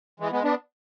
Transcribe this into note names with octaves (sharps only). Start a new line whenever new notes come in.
E3 G#3
G#3 B3
B3 D4